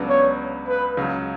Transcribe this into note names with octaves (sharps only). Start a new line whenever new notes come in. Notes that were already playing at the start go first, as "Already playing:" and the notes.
Already playing: C#2 C#3 F#3 B3 D4
C#5
B4
C#2 C#3 F#3